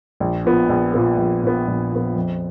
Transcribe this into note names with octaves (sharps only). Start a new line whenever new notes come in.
A#1
A#2 F3 B3
A#1
A#2 F3 B3
A#1
A#2 F3 B3
A#1
A#2 F3 B3
F2